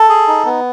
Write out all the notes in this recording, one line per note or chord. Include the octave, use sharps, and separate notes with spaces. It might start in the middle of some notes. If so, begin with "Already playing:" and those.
Already playing: A4
G#4
D#4
B3